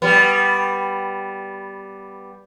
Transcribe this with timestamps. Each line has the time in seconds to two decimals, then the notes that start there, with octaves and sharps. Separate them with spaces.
0.02 G3 B3